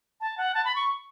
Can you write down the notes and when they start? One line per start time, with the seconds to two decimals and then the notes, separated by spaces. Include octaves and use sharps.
0.21 A5
0.38 F#5
0.54 A5
0.65 B5
0.76 C#6